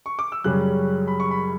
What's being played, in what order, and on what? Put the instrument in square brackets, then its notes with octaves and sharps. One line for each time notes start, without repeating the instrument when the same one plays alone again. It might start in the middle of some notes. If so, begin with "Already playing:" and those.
[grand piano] C#6
D6
E6
F#2 C#3 G3 C#4 F#6
B5
C#6
B5